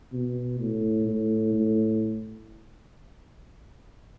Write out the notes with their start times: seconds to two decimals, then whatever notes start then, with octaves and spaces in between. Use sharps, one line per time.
0.13 B2
0.60 A2
1.08 A2
1.54 A2